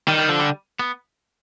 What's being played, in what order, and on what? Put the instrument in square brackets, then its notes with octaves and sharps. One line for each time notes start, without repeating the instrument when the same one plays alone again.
[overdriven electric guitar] D#3 [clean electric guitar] G3
[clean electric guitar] G3
[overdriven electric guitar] D3 [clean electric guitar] F3
[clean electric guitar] G3
B3